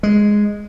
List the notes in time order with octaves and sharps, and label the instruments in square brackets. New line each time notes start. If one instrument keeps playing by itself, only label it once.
[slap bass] G#3